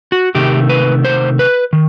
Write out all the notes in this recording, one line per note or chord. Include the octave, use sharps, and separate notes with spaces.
F#4
C3 D#3 A3 G4
B4
C5
B4
D#3